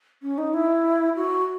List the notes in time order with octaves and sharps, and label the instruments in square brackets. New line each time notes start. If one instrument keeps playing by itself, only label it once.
[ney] C#4
D#4
E4
F#4